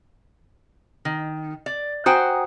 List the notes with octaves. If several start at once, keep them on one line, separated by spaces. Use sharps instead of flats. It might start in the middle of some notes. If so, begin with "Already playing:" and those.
D#3
D5
F#4 C5 G5 G#5 A#5 D#6